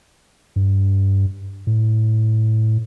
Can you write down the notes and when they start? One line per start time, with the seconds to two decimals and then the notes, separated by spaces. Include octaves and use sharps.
0.56 G2
1.67 A2